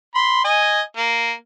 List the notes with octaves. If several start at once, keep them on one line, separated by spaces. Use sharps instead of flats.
B5 C6
D#5 G#5
A#3